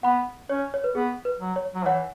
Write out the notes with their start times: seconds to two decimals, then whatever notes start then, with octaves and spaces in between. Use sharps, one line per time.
0.03 B3 F#5 B5
0.49 C#4 C#5
0.74 C#5
0.84 B4
0.95 B3 G#4
1.25 B4
1.40 F#3
1.56 C#5
1.74 F#3
1.86 E3 C#5 F#5